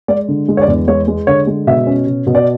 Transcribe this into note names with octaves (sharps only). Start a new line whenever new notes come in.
G#3 D5
D3
G#3
C#5
D5
E2
G#3 C#5
G#3
D3 C#5
G#3
B2 E5
C#4
B2
B2
D5